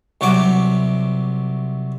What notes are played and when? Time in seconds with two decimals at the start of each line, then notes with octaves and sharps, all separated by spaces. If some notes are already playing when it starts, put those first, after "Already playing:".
0.21 C2 C3 F#3 C#6 D6